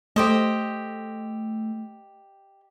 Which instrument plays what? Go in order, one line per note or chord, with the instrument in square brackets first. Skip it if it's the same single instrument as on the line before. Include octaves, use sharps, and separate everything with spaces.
[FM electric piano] A3 [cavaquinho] G4 C5 D#5